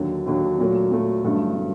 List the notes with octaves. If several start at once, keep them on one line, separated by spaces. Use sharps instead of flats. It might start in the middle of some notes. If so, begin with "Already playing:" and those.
Already playing: D#2 D3 F#3
D#2 D3 F#3
A#2 F#3 A3
A#2 F#3 A3
A1 G2 D3 F#3 A3
D3 F#3 A3